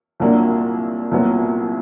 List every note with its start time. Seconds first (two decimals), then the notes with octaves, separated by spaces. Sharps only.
0.20 C2 A#2 F#3 A#3 D4
1.11 C2 A#2 F#3 B3